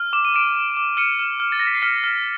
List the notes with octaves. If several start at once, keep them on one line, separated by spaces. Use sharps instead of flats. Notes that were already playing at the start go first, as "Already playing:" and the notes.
Already playing: F6
D6 E7
D#7
D6 D7 E7
D6
D6
F6 C#7 D#7
F6
F6
A6
F6 A#6
B6
C7
F6 B6 C#7
F6